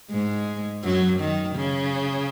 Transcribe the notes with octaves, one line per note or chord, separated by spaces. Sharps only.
G#2 G#3
F#2 F#3
D#3
C#3